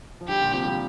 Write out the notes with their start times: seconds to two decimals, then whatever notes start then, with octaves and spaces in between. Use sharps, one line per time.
0.21 F3
0.28 D3 G3 G4
0.41 A#2 D3
0.53 C3 F3
0.64 D3 G3